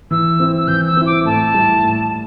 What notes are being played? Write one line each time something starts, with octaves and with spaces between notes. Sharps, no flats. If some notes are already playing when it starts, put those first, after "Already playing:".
E3 E6
C4 E4
E6
E3 G6
E6
C4 E4
D6
A2 A5
G3 E4
A2